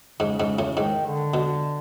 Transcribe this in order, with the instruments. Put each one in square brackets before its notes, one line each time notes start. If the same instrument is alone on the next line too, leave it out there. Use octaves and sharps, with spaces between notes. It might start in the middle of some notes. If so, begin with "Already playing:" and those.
[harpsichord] G#2 [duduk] C#3
[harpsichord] G#2
A2
[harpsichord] G#2 [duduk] D#3
[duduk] D3
[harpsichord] B2